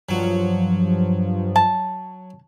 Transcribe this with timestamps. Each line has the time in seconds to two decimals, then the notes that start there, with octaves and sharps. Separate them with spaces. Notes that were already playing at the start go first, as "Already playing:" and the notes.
0.09 G2 F3 F#3
1.56 A5